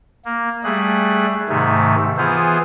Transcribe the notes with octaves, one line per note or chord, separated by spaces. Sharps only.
A#3
G3 A3 G#4 F#6
G#2 C3 D#3 A3
E3 B3 F4 G#4 C5